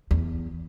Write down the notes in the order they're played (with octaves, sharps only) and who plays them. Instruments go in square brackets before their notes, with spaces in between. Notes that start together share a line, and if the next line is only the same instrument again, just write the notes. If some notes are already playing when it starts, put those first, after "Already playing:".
[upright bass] E2